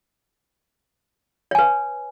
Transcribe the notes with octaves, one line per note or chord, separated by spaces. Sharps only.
B4 C#5 G#5